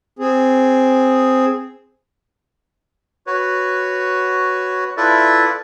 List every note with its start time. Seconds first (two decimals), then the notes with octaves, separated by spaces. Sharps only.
0.19 C4 G#4
3.27 F#4 B4 C#5
4.97 E4 F4 A4 B4 D5 E5